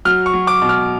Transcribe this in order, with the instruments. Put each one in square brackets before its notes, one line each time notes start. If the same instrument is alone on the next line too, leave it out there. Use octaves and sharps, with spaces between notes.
[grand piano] F#3 F6
C#6
F#3
D6
B2
F6